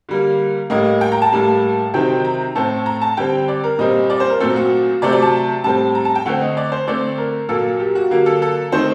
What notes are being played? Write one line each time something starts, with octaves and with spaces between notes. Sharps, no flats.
D3 G3 A#3
A2 G3 A#3 D#5
G5
A#5
A5
A2 G3 A#3
C3 D#3 F#3 C4 G5
A#5
A2 A3 C4 A5
A#5
A5
D3 G3 C4 G5
D5
A#4
A#2 G3 C4 D#5
D5
C5
A#4
A#2 F#3 A3 C4 A4
F#4
C3 F#3 A3 C4 D5
D5
A5
A2 G3 C4 A5
A#5
A5
G5
D3 A3 C4 F#5
D#5
D5
C5
D3 A3 C4 D5
A#4
A#2 F#3 A#3 A4
G4
F#4
D3 F#3 A#3 G4
A4
A4
D#3 A3 C4 C5